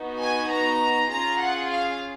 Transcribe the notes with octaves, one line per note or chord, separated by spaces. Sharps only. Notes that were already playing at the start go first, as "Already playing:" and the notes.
Already playing: B3 D#4 F#4
G#5
A#5
C#4 F4 G#4 A#5
F#5
F5